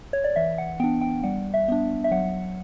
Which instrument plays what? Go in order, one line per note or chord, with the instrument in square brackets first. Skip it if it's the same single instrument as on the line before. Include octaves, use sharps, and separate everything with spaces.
[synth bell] C#5
D5
E3 E5
F#5
B3 G5
D4
G5
G3 F#5
E5
B3 D4
E5
F#3 F#5